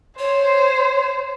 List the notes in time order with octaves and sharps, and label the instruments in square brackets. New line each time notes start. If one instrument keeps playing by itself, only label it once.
[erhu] C5 [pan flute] C#5